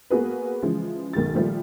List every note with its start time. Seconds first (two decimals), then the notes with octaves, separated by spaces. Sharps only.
0.10 A#3 B3 F#4 G#4 B4
0.62 C#3 E3 F3 G#3
1.13 B1 D#3 G#3 A6
1.34 A#2 D#3 F3 G3 A3